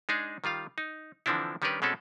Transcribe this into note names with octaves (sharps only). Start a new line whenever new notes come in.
G#3 D4 D#4 G#4
D#3 G3 F4 F5
D#4
D3 E3 F3 C4 D4 E4
D#3 G3 C#4 D4 A#4 B4
B2 G#3 C4 C#4 A4